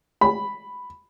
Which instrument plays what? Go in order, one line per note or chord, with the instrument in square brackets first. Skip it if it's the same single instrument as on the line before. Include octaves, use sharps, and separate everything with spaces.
[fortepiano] B5